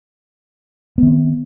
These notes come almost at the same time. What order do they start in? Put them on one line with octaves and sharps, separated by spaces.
B3 D#3 C4